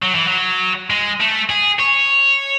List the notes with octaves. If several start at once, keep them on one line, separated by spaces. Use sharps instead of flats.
F#3
E3
F#3
G#3
A3
G#4
C#5